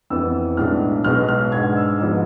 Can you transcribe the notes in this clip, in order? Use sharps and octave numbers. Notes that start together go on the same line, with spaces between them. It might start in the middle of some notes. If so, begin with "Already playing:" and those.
F2 E3 B3 E6
B1 A2 G#3 D4 F6
B1 B2 G#3 B3 F6
F6
G#2 G#3 D4 G#6
E6
G#2 F3 B3